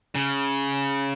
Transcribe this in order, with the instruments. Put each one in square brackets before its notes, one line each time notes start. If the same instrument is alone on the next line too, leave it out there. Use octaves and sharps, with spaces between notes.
[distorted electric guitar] C#3